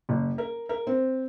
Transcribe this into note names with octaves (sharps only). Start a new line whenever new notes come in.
F#1
A#4
A#4
C4